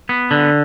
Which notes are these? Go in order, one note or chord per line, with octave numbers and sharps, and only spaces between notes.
B3
D3